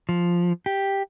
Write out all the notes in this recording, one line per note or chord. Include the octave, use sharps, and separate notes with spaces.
F3
G4